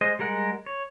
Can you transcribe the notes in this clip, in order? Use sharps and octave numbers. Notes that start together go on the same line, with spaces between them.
G#3 C5 D#5
G3 G#3 A#4 F#5
C#5